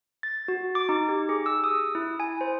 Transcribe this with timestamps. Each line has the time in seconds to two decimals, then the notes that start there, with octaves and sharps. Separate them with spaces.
0.23 A6
0.48 F#4
0.75 D6
0.89 D#4
1.09 G4
1.29 G#4
1.46 E6
1.64 D#6
1.95 E4
2.20 G#5
2.41 C5